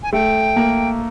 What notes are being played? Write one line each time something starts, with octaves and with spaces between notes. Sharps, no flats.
G#5
A3 G5
A#3